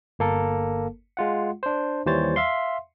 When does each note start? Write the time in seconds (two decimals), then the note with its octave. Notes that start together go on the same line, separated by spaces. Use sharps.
0.19 G1 A#3 A4 A#4
1.17 G#3 F4 F#5
1.63 D4 C5
2.06 D#2 E3 G3 C5 C#5 A6
2.36 E5 F5 C6